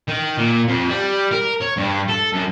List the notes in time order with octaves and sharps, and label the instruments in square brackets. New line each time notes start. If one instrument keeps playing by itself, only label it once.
[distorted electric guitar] D#3
A#2
F2
G3
A#4
C#5
G2
A4
F#2